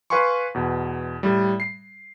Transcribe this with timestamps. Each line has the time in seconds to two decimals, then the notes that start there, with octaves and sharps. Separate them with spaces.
0.10 B4 F5 G#5 C6 C#6
0.54 E2 B2
1.23 A2 G3
1.60 C7